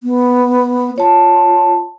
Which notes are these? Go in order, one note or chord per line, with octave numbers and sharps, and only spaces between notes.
B3
F4 C#5 A5